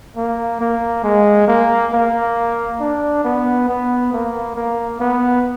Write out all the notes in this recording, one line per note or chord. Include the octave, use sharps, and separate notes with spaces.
A#3
A#3
G#3
A#3
A#3
D4
B3
B3
A#3
A#3
B3